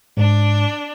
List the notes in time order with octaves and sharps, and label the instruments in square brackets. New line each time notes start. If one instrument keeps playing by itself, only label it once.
[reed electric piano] G#2 [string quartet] D4